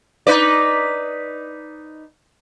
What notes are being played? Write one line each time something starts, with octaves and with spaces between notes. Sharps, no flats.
D#4 B4 D5